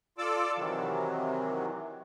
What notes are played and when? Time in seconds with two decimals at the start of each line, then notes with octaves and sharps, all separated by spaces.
0.18 F4 A4 D5 D6 E6
0.57 C3 D#3 E3 F#3